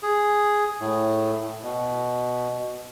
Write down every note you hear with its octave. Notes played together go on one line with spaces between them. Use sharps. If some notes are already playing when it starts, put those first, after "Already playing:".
G#4
A2
B2